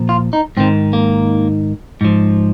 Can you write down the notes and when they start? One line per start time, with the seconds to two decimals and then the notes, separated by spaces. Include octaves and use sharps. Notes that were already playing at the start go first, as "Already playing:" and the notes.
Already playing: A#2 F3
0.09 F4
0.33 D#4
0.57 G#2 D#3 C4
0.93 A#3
2.01 G#2 F3